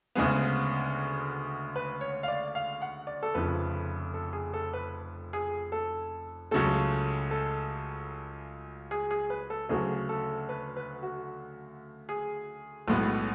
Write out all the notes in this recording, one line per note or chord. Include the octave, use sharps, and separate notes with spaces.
D2 C#3 G#3 B3 G#4
B4
C#5
F5
D5
F5
F#5
D5
A4
F1 F2 C#3 F3 B4
A4
G#4
A4
B4
G#4
A4
C#2 C#3 F#3 A3 A4
A4
G#4
G#4
B4
A4
D2 C#3 F#3 A3 G#4
A4
B4
B4
F#4
G#4
B1 A2 G#3 B3